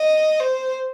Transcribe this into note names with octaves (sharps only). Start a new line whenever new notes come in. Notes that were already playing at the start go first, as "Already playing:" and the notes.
Already playing: D#5
C5